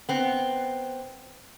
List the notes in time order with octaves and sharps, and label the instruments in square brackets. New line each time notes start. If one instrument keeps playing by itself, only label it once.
[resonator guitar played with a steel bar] B3 C4